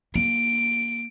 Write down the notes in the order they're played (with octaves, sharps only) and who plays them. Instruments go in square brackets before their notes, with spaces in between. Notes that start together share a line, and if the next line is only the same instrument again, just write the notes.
[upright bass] A#3 [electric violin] D7